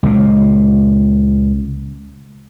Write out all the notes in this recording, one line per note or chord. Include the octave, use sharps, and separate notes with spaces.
C#2 A#2